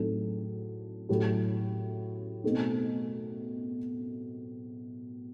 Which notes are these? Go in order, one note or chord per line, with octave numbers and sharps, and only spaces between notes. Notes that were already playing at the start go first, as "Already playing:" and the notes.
Already playing: A2 F#3 C4 D#4 A4
A2 F#3 A3 E4 G4
B2 A3 C4 D#4